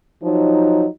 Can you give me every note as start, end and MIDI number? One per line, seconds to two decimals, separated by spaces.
0.22 0.86 53
0.22 0.86 54
0.22 0.86 63